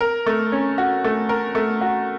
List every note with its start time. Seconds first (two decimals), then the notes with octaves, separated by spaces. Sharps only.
0.01 A#4
0.26 A3
0.52 C#4
0.78 F#4
1.04 A3
1.29 A#4
1.55 A3
1.81 F#4